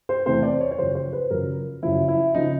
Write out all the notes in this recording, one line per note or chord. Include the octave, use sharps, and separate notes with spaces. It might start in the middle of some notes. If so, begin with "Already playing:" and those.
C5
E2 C3 E3 A3 C4 C5
D5
C#5
C#5
F#2 C#3 F3 C5
C5
B4
F#2 C#3 F3 A#4
F#2 C#3 F3 E4
E4
C#3 F3 D#4